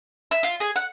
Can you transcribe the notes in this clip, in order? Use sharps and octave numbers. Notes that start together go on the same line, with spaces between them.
E5
F4
G#4
F#5